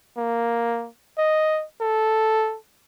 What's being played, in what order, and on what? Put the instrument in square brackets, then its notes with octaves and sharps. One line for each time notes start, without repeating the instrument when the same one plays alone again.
[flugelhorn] A#3
D#5
A4